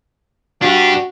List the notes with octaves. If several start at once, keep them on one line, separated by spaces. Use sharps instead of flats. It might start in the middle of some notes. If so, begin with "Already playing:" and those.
D4 F#4 G4